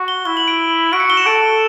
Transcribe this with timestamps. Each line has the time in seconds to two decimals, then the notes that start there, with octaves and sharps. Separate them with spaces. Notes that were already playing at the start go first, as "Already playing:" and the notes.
Already playing: F#4
0.08 G7
0.25 E4 G7
0.37 F#7
0.48 D7
0.93 F#4 D7
1.00 C#7
1.10 G7
1.17 E7
1.26 A4 D7